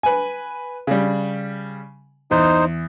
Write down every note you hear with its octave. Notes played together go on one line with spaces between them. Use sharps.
B4 G#5
C#3 G3
E2 D#4 C5